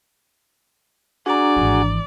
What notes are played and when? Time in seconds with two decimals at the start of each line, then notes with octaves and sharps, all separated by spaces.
1.26 D4 F#4 G#4 D5 A#5
1.57 G#1 E3